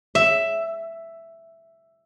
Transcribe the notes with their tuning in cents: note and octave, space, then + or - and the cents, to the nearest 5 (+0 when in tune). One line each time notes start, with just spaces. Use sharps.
E5 +5